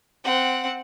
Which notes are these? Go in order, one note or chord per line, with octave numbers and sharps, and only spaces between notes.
C4 F#5